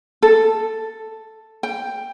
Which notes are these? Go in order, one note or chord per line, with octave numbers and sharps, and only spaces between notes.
A4
G5